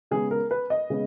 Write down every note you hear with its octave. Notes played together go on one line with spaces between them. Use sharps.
C#3 G#3 B3 G#4
A#4
B4
D#5
C#3 G#3 B3